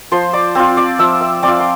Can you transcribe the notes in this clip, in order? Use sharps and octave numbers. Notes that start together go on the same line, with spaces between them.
F3 C5 C6
D5 D6
C4 F4 C5 C6
D5 D6
F3 E5 E6
E5 E6
C4 F4 D5 D6
C6